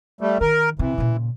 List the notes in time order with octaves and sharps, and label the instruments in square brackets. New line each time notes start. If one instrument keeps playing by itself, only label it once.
[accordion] G3 A3
[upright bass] D#3 [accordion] A#4
[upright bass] C3 [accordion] E3
[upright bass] A#2 C#3